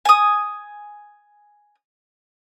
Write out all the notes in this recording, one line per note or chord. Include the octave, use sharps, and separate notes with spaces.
G#5 D#6